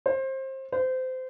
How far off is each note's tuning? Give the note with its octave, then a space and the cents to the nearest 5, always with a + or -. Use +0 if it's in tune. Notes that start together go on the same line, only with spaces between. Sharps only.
C5 +25
C5 -25